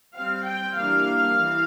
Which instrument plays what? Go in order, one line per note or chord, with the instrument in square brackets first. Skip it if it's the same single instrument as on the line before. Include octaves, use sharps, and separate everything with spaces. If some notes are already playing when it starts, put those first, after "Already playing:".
[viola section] G3 C4 F5
G5
E3 G3 A#3 D4 F5
E3